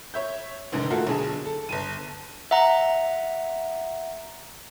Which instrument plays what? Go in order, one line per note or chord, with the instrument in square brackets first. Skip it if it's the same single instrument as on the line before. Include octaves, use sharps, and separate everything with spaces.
[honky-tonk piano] C#5 E5 G6
F1 A#1 D#2 G#2 D3
A3 A#3 F4 F#4 A4 A#4
B1 D3 G#4 A5
A4
G1 A5 D#7
[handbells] E5 F#5 A#5